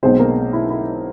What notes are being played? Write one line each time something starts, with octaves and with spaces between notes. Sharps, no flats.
B1 B2 G#3 C4 C5
A#3 A#4
E4
E4